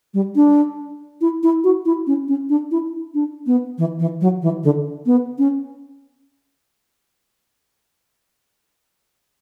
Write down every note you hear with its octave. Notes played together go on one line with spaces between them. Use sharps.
G3
D4
E4
E4
F#4
E4
C#4
C#4
D4
E4
D4
B3
E3
E3
F#3
E3
D3
B3
C#4